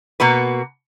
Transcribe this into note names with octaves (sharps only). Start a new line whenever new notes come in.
B2 A#3 F#4 B4